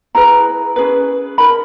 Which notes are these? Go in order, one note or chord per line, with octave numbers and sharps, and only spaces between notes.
E4 G#4 B4 A#5
C#4 G#4 B4
D#4 A#4 B5